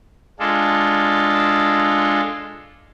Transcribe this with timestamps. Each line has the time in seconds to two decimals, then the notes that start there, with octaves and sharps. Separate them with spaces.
0.39 G#3 D4 F4 A4